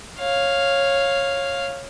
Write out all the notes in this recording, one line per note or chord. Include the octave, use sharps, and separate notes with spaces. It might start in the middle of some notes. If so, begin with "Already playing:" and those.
C#5 F5